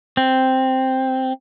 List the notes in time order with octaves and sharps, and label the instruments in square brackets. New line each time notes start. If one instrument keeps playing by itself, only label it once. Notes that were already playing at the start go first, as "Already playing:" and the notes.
[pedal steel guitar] C4